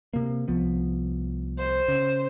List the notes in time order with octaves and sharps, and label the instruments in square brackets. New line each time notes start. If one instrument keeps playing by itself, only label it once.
[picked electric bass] C3 A#3
C2 F3 B3
[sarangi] C5
[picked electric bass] C#3